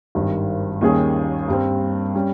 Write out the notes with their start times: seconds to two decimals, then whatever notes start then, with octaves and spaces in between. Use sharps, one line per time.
0.15 G#1 G2 D#3
0.81 D#2 D#3 G3 C#4 G#4
1.48 G2 G3 C4
2.15 G3 C#4